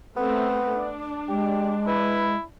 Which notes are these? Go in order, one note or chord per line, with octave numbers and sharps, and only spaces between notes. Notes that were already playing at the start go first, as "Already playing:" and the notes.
A3 B3 C4
D4
G#3 G4
E4 B4